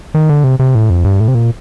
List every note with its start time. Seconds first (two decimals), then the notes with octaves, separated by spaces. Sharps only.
0.14 D#3
0.29 D3
0.44 C3
0.59 C3
0.75 A2
0.90 F2
1.04 G2
1.20 A2
1.28 C3
1.35 A#2